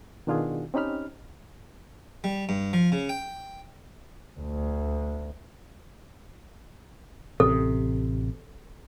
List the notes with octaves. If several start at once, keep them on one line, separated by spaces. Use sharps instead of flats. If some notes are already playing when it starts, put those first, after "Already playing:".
B2 D#3 D4 F4 F#4 G#4
C4 C#4 D#4 G4 B5 F6
G3
G2
F3
C#3
G5
D2
A1 C3 A4